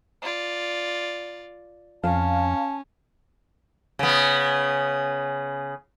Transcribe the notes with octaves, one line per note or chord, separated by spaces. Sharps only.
F4 D5
F2 C#4 F5 A5
C#3 B3